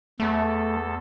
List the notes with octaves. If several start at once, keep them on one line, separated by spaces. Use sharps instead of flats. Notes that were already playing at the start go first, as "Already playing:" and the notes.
E2 A3 A4